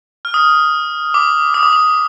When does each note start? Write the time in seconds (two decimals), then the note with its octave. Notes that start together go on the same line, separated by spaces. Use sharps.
0.25 F6
0.34 D#6
1.14 D6
1.54 D#6
1.63 D6
1.73 D#6